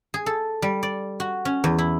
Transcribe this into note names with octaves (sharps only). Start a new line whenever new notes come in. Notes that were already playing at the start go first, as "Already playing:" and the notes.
G#4
A4
G3
D5
F#4
C#4
E2
E4